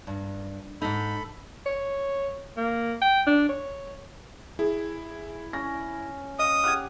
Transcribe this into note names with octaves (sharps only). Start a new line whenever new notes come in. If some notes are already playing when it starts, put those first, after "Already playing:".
G2
G#2 D#4 A4 B5
C#5
A#3
G5
D4
C#5
E4 G#4
C#4 A#6
D#5 F5 D#6
G4 F#5 D6 F6 G#6